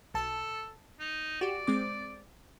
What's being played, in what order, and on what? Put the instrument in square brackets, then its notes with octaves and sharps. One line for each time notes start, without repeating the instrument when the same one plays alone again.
[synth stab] B1 A5 [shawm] A4
[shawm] D#4
[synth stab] F#4 G4 [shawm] D5
[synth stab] G#3 C4 D6